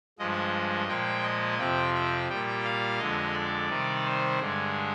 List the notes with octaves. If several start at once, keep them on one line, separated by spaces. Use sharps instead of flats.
G2 F3 G#3 D#5
A#2 F3 G#3 G5
D#5
F2 C3 F3 G5
G5
A#2 G3 G5
F5
F2 D3 G#3 D#5
D5
C3 D#3 G3
C5
G2 D3 G#3 G#4